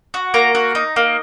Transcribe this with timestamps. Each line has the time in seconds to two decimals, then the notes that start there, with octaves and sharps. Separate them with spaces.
0.14 F#4
0.34 A#3 A#5
0.55 F#4
0.75 D#4
0.96 A#3